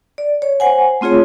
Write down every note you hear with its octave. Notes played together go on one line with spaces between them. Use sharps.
D5
C#5
C5 F#5 G#5
A3 C4 F4 G#4 C#5